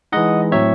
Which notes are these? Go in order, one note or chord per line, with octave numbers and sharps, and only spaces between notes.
E3 G#3 D#4 D#5 F#5
A2 F#3 C4 C#5 E5